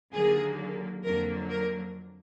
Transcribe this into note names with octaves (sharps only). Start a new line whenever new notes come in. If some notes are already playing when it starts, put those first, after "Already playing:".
D#2 D3 F#3 A#3 G#4
F2 D3 F#3 A#3 A#4
A#4